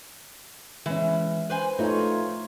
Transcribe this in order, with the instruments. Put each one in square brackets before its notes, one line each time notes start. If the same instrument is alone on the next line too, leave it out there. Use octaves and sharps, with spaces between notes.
[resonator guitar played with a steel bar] E3 [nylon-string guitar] G#3 C#4
[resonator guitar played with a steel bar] B4 C5 G#5
[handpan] A3 F4 C#5 [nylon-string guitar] D#4